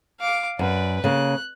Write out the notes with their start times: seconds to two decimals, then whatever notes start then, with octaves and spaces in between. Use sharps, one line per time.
0.20 F5 D6
0.59 F#2 B4 D5
1.04 C#3 A#3 F#6